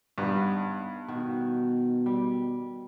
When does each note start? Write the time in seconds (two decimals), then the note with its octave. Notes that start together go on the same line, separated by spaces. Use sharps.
0.18 G2 B3 D#4 C5
1.08 B2 D#3 F#4
2.06 G3